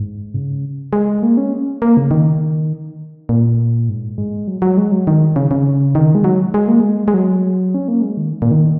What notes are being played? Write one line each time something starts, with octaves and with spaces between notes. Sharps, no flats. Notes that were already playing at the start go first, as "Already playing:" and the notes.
Already playing: G#2
C#3
G#3
A#3
C#4
A#3
C#3
D#3
A#2
G#2
G#3
F#3
F#3
G#3
F#3
D#3
C#3
C#3
D#3
G#3
F#3
G#3
A#3
G#3
G#3
F#3
C#4
A#3
G#3
D#3
A#2
D#3